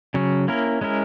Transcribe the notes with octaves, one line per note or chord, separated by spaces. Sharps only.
C#3 F#3 C#4
A#3 C#4 E4 A#4
G#3 C#4 E4 A#4